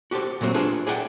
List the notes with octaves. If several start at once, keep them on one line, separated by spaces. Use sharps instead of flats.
F#4 G4 A4 C5
A#2 F#3 A3 C4 F#4
D4 F4 G#4 A4 B4 C5
G#4 D5 E5 F#5 G5